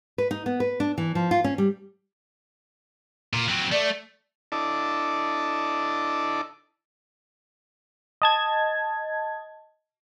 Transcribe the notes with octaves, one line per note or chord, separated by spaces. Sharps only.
B4
D#4
B3
B4
D4
E3
F3
F4
C#4
G3
A#2
F#3 C4
A3 D5
D4 E4 A4 D5 D#5 A5
D#5 A5 G#6